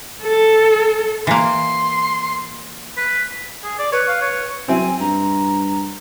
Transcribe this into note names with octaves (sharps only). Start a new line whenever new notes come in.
A4
E3 A#3 C6
B4
G#4
D5
B4 C#5
F5
C#5
F#3 C4 E4 G#5
G2 A#5